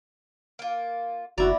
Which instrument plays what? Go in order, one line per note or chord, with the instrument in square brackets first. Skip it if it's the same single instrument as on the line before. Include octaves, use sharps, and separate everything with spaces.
[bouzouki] A#3 F4
[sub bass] F#1 [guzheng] B3 E4 D5 [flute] F#4 [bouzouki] A#5